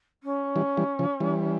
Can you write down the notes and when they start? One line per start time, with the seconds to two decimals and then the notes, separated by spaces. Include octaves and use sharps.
0.23 C#4
0.56 E3 G3
0.77 E3 G3
0.99 C#3 F3
1.20 E3 G3